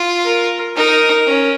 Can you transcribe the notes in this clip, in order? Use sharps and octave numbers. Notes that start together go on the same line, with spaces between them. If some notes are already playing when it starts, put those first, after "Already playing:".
Already playing: F4
A#4
D#4 A#4
C#4